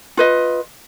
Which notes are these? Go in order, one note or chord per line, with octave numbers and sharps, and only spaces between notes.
F4 B4 D#5